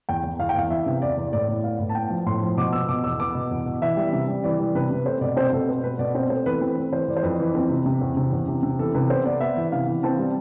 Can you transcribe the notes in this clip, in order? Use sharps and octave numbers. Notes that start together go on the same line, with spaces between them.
E2 G5
E2
E2 F5
G5
E2 F5
E3 E5
C3
E2 D5
E2
A2 D5
A2
B3 F5
A2
A5
B3 G5
F3
A2 C6
F3
B2 D6
B3 E6
B2 D6
E2 E6
B3 D6
B2
E2
B2
E3 E5
G3
C3
G3
E3 D5
G3
C3 B4
C3
A3 C5
B2 D5
C4 C5
B2 A4
A3 B4
B2 B4
B2 D5
C4 C5
A3 C5
E3 B4
A4
C4
A3
E3 C5
E3 D5
C5
F2 B4
E3
C4
C3
C3
E2
C3
E2
C3
C3
E3 A4
C3 B4
B3 C5
B3 D5
B3 E5
E3
C3 F5
E3
C4 A5
G3